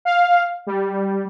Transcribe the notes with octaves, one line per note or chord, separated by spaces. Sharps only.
F5
G3